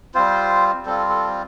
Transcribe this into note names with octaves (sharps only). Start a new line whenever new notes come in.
G3 C4 F4 C5
G3 C4 F4 A4
A4